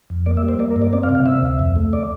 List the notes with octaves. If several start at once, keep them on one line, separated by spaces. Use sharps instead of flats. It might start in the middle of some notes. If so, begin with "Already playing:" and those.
F2
A#3 D5
E5
G3
C5
A#3 D5
A#4
G2
D5
C4 D5
F5
C3
F5
C3 E5
D2
F2
A3
D5